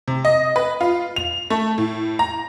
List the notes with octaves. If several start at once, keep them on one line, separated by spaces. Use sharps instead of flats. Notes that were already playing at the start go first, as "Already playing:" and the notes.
C3
D#5
B4
F4
F7
A3
A2
A#5